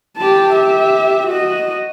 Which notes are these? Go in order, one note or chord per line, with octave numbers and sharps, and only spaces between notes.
G4 A5
G4 E5
F#4 D#5